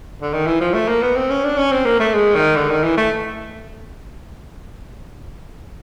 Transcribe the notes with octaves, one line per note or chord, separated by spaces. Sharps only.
D3
D#3
E3
F3
A3
A#3
B3
C4
C#4
D4
C#4
C4
A#3
A3
G#3
D#3
D3
D#3
E3
A3